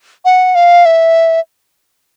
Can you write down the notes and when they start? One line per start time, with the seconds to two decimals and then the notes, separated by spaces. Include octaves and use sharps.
0.25 F#5
0.55 F5
0.85 E5